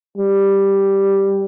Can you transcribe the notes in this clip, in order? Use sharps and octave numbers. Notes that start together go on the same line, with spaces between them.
G3